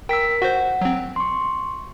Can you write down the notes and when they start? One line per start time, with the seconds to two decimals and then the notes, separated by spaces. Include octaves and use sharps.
0.09 A#4 G5 E6 B6
0.42 F#4 C5 F#5
0.81 F#3 C4
1.16 C6 C#6